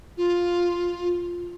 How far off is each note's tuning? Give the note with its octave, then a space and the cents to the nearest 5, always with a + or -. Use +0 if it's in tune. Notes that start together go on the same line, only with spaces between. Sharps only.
F4 +5